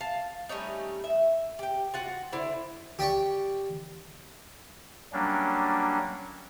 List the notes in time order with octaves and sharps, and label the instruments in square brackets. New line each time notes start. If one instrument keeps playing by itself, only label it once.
[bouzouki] F5 A5
G3 A3 C#4 D#4
E5
G4 G5
F4 F#4 F#5
D3 E4 C5
[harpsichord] G4 D5 G5 C#6
[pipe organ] F#3 G3 A#3 C#4 D4